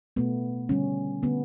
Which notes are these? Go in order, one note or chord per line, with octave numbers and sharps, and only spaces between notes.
B2 A3 B3
D3 G3 C#4
D3 A3 B3